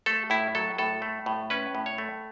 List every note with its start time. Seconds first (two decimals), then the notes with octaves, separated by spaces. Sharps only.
0.06 A3 A4
0.30 A2 E4
0.55 F#3 A4
0.78 A2 A4
1.02 A3
1.26 A2
1.50 C#4 B4
1.75 A2
1.86 C#5
1.98 A3